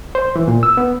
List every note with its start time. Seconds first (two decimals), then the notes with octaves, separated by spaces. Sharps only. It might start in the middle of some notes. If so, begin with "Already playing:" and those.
0.15 C5
0.36 E3
0.48 A#2
0.63 E6
0.77 B3